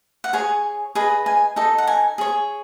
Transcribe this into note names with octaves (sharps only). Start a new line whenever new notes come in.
F#5
G#4 C#5 G#5
G#4 B4 D#5
G#5
D#4 A4 D#5
F#5
G#5
G#4 C#5